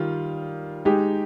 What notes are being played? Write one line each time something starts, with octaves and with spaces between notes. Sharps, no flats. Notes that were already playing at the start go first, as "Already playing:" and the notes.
Already playing: D#3 G3 F4
G#3 D#4 G4